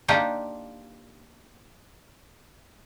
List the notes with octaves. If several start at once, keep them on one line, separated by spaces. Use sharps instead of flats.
A#3 D4 D#4 F4 G4